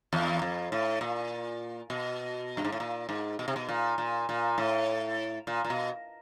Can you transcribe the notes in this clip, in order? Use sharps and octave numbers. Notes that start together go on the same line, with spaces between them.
E2
F2
A2
A#2
B2
G2
G#2
A2
A#2
G#2
B2
C3
B2
A#2
A#2
A#2
A2
A#2
A#2
B2